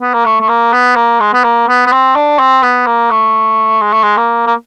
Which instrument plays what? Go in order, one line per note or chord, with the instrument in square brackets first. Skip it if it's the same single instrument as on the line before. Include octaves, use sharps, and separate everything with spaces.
[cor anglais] B3
A#3
A3
A3
A#3
B3
A#3
G#3
B3
A#3
B3
B3
C4
D4
C4
B3
A#3
A3
G#3
A3
G#3
A#3
A#3